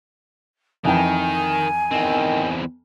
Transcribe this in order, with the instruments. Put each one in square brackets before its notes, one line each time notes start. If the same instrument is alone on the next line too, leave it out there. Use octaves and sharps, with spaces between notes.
[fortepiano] F2 E3 G5 [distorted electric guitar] D#3 [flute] G#5
[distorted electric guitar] E2 C4 [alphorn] D#3